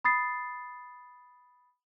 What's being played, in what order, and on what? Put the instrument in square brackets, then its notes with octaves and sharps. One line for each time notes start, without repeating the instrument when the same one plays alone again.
[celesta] B5 D#6 A6 C7